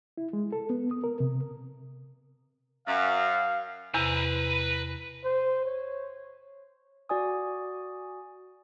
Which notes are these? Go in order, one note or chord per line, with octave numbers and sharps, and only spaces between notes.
E4
G#3
A4
B3
D#6
A#4
C3
F#2 F5
E2 C3 B4 A#5
C5
C#5
F#4 D5 G#5 D#6